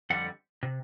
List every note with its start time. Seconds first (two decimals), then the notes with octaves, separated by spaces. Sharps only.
0.10 F2 D3 G3 F#5
0.63 C3